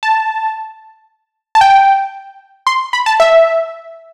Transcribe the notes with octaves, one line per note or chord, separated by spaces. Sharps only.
A5
A5
G5
C6
B5
A5
E5